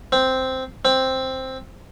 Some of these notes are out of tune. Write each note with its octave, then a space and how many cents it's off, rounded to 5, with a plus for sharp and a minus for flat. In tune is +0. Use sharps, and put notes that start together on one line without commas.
C4 -5
C4 +5